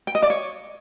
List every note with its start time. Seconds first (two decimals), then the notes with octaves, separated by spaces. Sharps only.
0.07 G5
0.15 D#5
0.22 D5
0.30 C#5